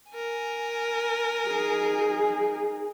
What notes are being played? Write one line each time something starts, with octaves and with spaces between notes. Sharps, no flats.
A#4 G#5
D#4 G#4